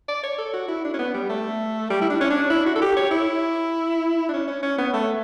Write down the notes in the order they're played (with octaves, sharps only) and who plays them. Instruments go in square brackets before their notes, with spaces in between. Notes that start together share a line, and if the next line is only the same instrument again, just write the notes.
[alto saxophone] D5
C#5
A4
F#4
E4
D4
C#4
B3
G3
A3
G3
E4
D4
C#4
D4
E4
F#4
A4
G4
C#5
E4
D4
C#4
C#4
C#4
B3
A3